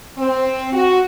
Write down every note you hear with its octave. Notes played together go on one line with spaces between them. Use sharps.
C4
F#4